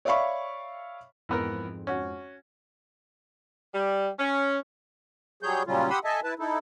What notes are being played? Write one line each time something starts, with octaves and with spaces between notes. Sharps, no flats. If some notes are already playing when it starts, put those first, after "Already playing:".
C#5 D5 E5 F5 B5 C#6
F2 G#2 E3 B3 C4 A#4
C#4 F#4
G3
C#4
F#3 G3 G#4 C#5 G6
A#2 C#3 F#3 G3 C#4 F4
G4 F#5 B5 C6 D#6 E6
A4 D#5 E5 G#5 A5
E4 B4 A5
D#4 E4 A4